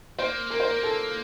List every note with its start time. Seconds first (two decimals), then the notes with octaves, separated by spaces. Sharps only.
0.19 A#3 C5
0.50 A#3 A#4
0.60 C5
0.69 A#4
0.83 A4